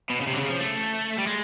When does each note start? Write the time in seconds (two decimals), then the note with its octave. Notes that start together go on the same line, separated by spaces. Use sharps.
0.10 B2
0.21 C#3
0.27 C3
0.33 D3
0.38 C#3
0.49 F3
0.60 A3
1.18 G3
1.27 G#3